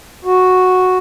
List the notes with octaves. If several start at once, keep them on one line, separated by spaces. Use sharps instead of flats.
F#4